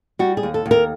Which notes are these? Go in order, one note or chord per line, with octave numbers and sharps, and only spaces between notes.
G3 F#4
G#4
D#2
A4
D#2
A#4